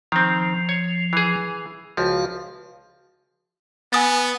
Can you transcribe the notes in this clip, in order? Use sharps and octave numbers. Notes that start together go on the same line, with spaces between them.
D#3 F3 C4
C#5
E3 G#4
C#2 F3 F#4 F5
B3 G#5 D#6 A6